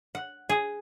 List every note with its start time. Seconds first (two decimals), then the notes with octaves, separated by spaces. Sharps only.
0.15 F#5
0.49 G#4